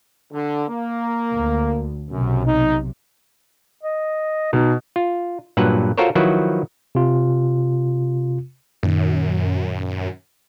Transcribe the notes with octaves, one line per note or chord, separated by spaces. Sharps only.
D3
A#3
D2
B1 F#2 C3
D#4
D#5
B2 D#4
F4
G2 A#2 F#3 B4 F#5
F4 F#4 A4 A#4 C5 C#5
D#3 F3 F#3 E4 F#4 B4
C3 F4
F#2 A#2 D#3